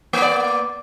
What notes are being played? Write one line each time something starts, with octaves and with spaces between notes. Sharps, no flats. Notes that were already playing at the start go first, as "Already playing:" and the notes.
A#3 B3 D5